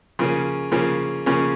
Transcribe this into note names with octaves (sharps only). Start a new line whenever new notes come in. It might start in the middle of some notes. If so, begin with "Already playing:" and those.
C#3 F3 A#3 C#4
C#3 F3 A#3 C#4
C#3 F3 A#3 C#4